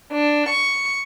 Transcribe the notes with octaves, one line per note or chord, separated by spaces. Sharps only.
D4
C#6